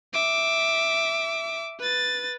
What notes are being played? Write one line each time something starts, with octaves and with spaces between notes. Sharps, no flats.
E5 D6
B4 A6